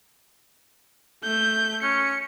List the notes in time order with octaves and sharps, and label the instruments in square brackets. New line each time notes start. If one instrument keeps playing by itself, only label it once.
[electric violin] A3 G6
[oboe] C#4 [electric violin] C#7